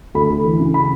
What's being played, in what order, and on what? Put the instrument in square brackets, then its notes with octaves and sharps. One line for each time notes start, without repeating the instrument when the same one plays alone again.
[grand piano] D2 B5
D2
E3
C#3
B5